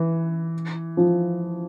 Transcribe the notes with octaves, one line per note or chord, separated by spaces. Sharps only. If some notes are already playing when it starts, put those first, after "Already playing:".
Already playing: E3
F3